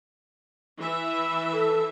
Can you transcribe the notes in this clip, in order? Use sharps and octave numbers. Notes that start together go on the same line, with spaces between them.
E3 E5
A4